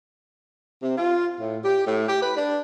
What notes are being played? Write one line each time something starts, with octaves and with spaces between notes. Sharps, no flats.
C3
F4
A2
G4
A2
G4
B4
D4